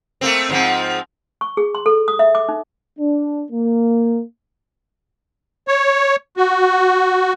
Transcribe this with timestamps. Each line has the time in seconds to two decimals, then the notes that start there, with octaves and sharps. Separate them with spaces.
0.21 A3 A#3 C4
0.50 G#2 F3 C4
1.41 C#6
1.57 G#4
1.75 C6
1.86 A4
2.08 D#6
2.19 E5
2.35 D6
2.49 D#4
2.99 D4
3.51 A#3
5.68 C#5
6.37 F#4